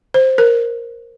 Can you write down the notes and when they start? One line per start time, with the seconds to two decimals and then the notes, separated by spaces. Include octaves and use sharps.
0.14 C5
0.38 A#4